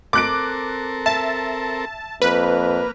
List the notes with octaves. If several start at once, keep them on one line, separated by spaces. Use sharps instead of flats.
C4 A4 A#4 D6 F#6 D7
E5 A5
F2 A#3 B4 F6